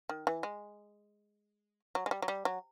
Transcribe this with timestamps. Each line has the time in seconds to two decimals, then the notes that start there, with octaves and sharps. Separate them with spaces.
0.09 D#3
0.27 E3
0.43 G#3
1.95 F#3
2.06 G#3
2.11 G3
2.22 F#3
2.28 G3
2.45 F#3